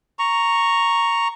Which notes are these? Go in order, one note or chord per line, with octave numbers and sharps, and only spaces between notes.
A#5 C#6